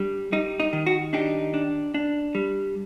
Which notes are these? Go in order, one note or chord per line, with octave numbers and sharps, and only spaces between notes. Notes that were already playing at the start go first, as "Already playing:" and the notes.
Already playing: G3 D4
G3 D#4
D#4
D#3
F#4
D4 D#4 G4
D4
D4
G3